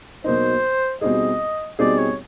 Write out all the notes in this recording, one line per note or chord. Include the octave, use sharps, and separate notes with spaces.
B2 F#3 A#3 D#4 C5
B2 G3 C4 D#4 G#4 D#5
B2 G3 C4 D#4 G#4 D5
C#5